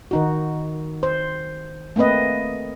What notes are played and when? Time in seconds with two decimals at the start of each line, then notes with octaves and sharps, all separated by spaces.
0.11 D#3 D#4 F#4
1.03 C5
1.96 A3 A#3 C4 B4 D#5